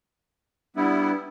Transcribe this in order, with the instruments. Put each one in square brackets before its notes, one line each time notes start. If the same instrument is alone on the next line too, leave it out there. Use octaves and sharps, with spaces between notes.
[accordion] G3 B3 E4 [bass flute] D4